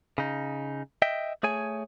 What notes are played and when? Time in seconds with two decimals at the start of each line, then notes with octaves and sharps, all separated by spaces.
0.18 C#3 D#4
1.02 D#5 E5 G5
1.43 A3 G#4 C#5 G#5